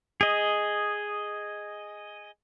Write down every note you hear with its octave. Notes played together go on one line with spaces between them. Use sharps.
G#4 D#5